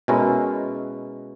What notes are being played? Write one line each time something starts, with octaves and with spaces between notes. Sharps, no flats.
B2 G#3 C#4 E4 A#4